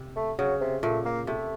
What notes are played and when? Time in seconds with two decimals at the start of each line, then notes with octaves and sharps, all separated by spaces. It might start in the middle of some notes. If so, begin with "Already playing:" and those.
Already playing: C3
0.16 A3
0.38 C#3 F#3
0.61 C3
0.83 A#2 A3
1.05 A#3
1.27 C3 A3